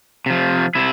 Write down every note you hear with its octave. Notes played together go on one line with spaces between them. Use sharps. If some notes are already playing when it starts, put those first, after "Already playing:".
C3 F3
C3 E4